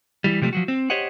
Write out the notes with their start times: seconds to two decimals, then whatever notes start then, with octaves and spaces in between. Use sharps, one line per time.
0.24 E3 G3
0.41 C3 F3 G3 A3
0.53 F3 F#3 F#4
0.68 C4
0.90 G4 C5 C#5 D#5 F#5